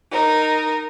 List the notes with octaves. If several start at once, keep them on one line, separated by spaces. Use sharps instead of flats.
D#4 A#4